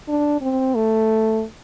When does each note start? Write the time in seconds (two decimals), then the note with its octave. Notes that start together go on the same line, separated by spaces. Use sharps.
0.09 D4
0.41 C4
0.75 A3